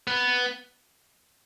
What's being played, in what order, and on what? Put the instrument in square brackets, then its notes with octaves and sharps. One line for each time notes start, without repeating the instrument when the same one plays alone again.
[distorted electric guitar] B3